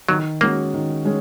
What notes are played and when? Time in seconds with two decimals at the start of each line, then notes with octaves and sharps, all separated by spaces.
0.09 D#3 F#3
0.41 G#3 A#3 C#4 F#4
0.74 D#3
1.05 G#3 C#4